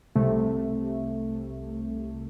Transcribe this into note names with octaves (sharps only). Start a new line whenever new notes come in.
C2 C3 A3